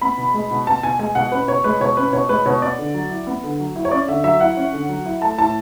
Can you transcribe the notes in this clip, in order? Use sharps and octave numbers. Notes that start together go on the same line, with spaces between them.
B3 B5
B2
G#3
B2
B3 A5
B2 G#5
G#3 G#5
B2 F#5
C#4 B4
B2 C#5
G#3 B4
B2 C#5
C#4 B4
B2 C#5
G#3 B4
B2 C#5
B3 D5
D3
F#3
E4
B3
D3
F#3
E4
C#5
C#4 D5
D3 E5
F#3 E5
E4 F#5
C#4
D3
F#3
E4
A3 A5
A2 A5